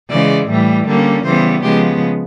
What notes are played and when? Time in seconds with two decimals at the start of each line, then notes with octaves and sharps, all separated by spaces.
0.09 C#3 E3 G#3 D5
0.48 A2 E3 G3
0.87 D3 G3 A#3 C#4
1.24 C#3 E3 G3 B3 C5
1.63 C#3 F3 G#3 B3 G4